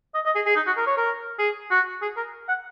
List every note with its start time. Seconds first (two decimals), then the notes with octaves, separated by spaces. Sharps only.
0.15 D#5
0.26 D#5
0.35 G#4
0.46 G#4
0.56 D#4
0.67 F#4
0.77 A#4
0.87 C#5
0.97 A#4
1.39 G#4
1.71 F#4
2.02 G#4
2.17 A#4
2.49 F#5